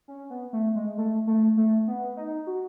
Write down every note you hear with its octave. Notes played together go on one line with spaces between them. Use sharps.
C#4
B3
A3
G#3
A3
A3
A3
B3
D#4
F#4